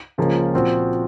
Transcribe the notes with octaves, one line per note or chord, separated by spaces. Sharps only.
C#2 C#3 F3 A#3 C#4
A#2 F3 C4 F#4